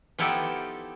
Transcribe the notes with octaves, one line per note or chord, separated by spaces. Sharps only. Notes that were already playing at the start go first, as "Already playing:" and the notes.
F3 B3 D#4 E4 G4 A4